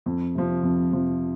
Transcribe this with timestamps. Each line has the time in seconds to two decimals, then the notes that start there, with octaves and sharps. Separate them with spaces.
0.06 F2
0.35 C3 F3
0.63 F2
0.93 C3 F3